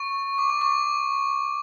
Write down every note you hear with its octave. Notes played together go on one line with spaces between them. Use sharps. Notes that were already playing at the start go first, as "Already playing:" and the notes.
Already playing: C#6
D6
C#6
D6